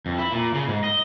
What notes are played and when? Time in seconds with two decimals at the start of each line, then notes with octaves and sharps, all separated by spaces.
0.06 F2
0.18 E4
0.32 A#2
0.54 C#3
0.68 G#2
0.84 D#5